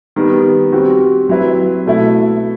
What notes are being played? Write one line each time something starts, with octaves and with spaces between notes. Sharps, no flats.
D#3 G3 B3
G3 C4 F#4
F#3 C4 E4 B4
B2 A3 E4